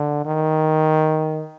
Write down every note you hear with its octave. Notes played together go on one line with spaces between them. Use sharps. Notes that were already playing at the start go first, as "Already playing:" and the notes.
Already playing: D3
D#3